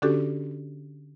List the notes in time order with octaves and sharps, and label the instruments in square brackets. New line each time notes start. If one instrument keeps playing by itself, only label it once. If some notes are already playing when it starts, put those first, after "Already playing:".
[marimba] D3 C#4 D4 F#4 G4 A4